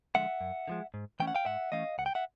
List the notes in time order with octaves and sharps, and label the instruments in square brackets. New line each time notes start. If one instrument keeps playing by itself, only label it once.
[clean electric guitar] D3 F3 G#3 E5 F#5
F#2
D3 F3 G#3
G#2
E3 A3 C#4 G5
F#5
F5 G5
G#2 E5 F#5
E3 A3 C#4 D#5 F5
C#2 F#5
G5
E5 F#5